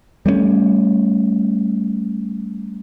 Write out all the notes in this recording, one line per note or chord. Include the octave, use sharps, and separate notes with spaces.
G3 A3 A#3 C#4